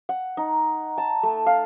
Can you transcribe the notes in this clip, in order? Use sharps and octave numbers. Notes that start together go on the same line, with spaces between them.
F#5
D#4
A5
A3
F5